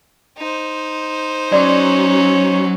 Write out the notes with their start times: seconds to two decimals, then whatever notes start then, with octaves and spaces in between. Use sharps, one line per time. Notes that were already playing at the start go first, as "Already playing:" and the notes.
0.37 D#4 C5
1.52 F#3 C#4 D5 C6 D6